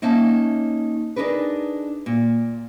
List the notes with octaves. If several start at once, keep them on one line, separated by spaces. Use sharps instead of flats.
A#3 C#4 D#4 C#5 E5 A5
D4 D#4 G#4 A#4 B4
A#2